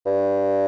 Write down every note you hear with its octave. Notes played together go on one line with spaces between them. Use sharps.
G2